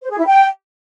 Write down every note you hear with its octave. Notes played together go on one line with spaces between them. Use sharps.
C5
G#4
E4
G5